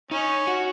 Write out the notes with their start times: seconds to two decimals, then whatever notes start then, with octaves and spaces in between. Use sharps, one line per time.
0.11 C#4 D#4
0.47 F#4